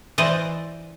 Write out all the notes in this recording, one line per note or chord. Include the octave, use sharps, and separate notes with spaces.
E3 C5 D5 D#5